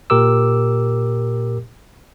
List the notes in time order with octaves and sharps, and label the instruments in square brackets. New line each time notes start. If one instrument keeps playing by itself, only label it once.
[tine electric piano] A#2 G4 A#4 D6 E6